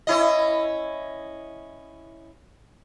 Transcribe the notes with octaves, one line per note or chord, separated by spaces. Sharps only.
C#4 E4 D#5